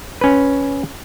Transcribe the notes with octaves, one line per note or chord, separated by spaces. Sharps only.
C#4 B4